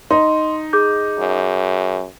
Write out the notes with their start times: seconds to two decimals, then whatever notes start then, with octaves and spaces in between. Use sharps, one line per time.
0.11 D#4 C6
0.73 G#4 D6 G6
1.19 F#2